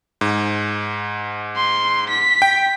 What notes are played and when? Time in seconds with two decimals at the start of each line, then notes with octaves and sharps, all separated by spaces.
0.21 G#2
1.56 C6
2.10 B6
2.42 G5